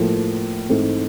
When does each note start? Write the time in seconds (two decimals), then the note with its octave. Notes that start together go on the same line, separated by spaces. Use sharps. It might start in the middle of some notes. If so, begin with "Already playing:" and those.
Already playing: A2 F3 A#3
0.69 G#2 E3 A3 C4